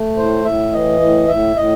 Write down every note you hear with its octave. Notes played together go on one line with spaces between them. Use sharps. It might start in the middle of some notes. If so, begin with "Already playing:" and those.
Already playing: A3
A2 C5
A2 E5
E3 D#5
A2
A2 E5
A2 D#5